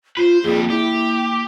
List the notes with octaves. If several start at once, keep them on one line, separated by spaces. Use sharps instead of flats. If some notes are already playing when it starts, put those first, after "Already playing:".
F4 B4 C5
F2 G3 A#3 G#4
E4 G4